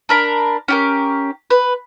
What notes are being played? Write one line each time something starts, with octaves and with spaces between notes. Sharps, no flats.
D4 A#4 B5
C#4 G4 A#4
B4